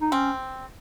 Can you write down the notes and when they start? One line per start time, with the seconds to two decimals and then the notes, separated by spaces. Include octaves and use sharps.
0.01 D#4
0.12 C4 C#4